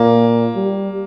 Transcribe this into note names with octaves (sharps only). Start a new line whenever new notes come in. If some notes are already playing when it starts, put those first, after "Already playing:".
Already playing: A#2 A#3
G3